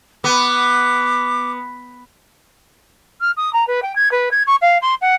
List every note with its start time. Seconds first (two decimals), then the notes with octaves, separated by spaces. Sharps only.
0.24 B3 D6
3.20 F6
3.37 D#6
3.53 A#5
3.67 B4
3.82 G5
3.95 G#6
4.11 B4
4.31 G#6
4.46 C#6
4.61 F5
4.81 C6
5.01 F#5